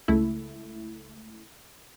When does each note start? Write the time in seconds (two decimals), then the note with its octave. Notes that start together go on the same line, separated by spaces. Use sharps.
0.08 C#2 A3 E4